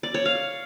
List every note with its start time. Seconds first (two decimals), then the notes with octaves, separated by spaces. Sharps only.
0.03 D5
0.14 C#5
0.25 F5